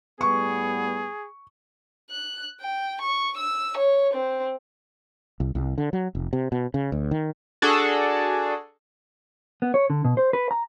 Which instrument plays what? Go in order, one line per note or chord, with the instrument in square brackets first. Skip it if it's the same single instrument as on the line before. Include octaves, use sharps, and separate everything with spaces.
[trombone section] A2 G3 B3 [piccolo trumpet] G#4 [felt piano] C#6
[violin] F#6
G5
C#6
E6
C#5
C4
[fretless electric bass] C2
C2
D3
F#3
F1
C3
B2
C#3
D2
D#3
[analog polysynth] D4 F#4 G#4 A4
[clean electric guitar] B3
C#5
D3
B2
C5
B4
A#5